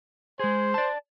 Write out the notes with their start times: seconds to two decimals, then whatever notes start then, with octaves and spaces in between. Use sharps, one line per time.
0.40 G#3 G#4 C5
0.74 D5 A5